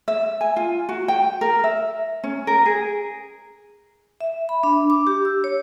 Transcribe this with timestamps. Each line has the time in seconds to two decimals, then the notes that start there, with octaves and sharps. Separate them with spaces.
0.08 E5
0.41 G#5
0.56 F4
0.89 F#4
1.08 G5
1.41 A#4
1.64 E5
2.24 C#4
2.47 A#4
2.66 G#4
4.21 E5
4.49 B5
4.63 D4
4.90 D6
5.07 G4
5.25 E6
5.44 C#5